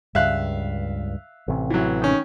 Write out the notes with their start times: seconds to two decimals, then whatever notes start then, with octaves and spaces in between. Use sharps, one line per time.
0.15 C#2 G2 E5 F5 F#6
1.48 A1 C3
1.70 E3 F#3
2.02 D#3 C#4